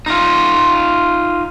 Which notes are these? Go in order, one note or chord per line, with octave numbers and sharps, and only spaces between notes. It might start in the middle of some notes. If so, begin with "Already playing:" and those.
D#4 F4